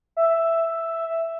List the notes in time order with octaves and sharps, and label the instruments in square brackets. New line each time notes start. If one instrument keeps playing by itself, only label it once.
[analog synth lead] E5